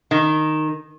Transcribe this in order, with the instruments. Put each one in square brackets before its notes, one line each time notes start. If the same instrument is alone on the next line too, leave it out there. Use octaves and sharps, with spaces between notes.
[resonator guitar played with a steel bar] D#3